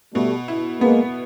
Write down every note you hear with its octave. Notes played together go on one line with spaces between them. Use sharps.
B2 G3 A3
E4
G#3 A#3 B3